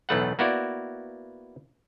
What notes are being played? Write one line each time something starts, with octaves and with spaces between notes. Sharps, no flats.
B1 E2 A2 A3 B4 F#5
A#3 B3 E4 F#4 D5